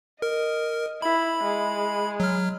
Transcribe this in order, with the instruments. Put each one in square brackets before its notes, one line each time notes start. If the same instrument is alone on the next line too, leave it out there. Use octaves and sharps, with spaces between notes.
[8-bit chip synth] A#4 [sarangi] D#5
[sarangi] E4 [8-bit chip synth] B5
[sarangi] G#3
[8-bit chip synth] F#3 F6